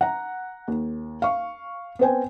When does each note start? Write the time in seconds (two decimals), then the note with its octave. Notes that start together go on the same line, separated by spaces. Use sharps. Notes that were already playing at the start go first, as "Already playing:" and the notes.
0.01 F#5 A#5
0.68 D#2
1.22 F5 C#6
1.99 B3 C4 C5 G5 G#5